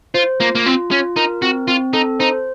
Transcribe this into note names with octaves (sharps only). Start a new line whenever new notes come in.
F4 C5
A#3 F4
A#3
C4 F4
C#4 F4
D#4 A#4
C4 F#4
C4 F4
D#4 A4
D#4 C5